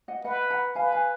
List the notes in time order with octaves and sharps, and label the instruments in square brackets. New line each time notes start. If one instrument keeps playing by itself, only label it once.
[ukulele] D#5 F#5
[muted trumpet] B4 [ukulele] D#5 F#5
[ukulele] F#5 A#5
[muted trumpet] B4 [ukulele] F5 G#5
[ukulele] F5 G#5